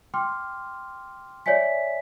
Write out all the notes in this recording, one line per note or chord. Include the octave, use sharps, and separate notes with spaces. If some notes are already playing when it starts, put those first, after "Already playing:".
G5 C6 D6 F6
C#5 D5 E5 G#5 B6